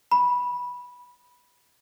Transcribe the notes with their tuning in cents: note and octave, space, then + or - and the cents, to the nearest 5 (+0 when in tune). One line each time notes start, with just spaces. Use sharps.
B5 -10